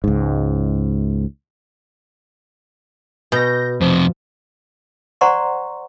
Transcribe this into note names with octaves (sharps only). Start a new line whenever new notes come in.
C#2 G#2
B2 G6 A#6
F2 C3 F3
C5 D5 F#5 A#5 C6 C#6